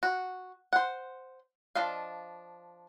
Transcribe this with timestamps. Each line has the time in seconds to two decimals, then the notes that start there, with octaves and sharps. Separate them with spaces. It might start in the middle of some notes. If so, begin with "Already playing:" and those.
0.03 F#4
0.73 C5 F#5
1.75 F3 D4 D#5 F5